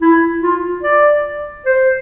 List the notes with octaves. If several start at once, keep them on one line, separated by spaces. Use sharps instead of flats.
E4
F4
D5
C5